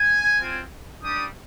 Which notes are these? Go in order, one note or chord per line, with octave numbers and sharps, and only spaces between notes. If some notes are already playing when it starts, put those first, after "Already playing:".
Already playing: G#5
C4 F4
G3 D4 G4 D#6